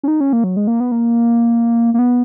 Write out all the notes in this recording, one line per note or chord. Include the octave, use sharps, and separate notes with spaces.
C#4
D#4
C#4
A#3
F#3
G#3
A#3
B3
A#3
A#3
B3